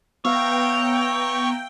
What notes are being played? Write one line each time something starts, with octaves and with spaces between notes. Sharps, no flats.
B3 C#5 E5 F5 G5 A#5 C#6